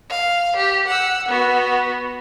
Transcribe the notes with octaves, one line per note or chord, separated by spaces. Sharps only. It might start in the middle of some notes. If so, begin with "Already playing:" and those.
F5
G4
F#5 E6
B3 F#4